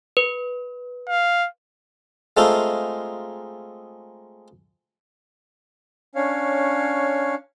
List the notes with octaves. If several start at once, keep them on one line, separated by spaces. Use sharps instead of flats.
B4
F5
G#3 A3 C4 D#4 F4 A4
C#4 D4 C#5 F5